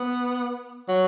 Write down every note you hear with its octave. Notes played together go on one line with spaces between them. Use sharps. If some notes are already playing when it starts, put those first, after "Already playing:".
Already playing: B3
F#3